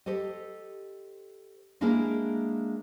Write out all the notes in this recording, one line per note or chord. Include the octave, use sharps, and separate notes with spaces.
G4 A4 C5 D#5
G#3 A#3 D4 E4 G#4 A#4